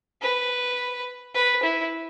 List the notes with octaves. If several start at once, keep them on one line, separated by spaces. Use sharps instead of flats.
B4
B4
E4